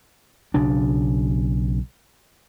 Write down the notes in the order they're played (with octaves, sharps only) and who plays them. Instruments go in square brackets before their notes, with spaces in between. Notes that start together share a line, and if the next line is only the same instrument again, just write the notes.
[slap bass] B1 C#3 D4